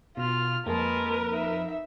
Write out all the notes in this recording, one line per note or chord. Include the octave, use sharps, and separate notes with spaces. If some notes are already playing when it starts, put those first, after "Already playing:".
B2 F4 F6
F2 G#3 A#3 A#4 B4 A5
D#4 E5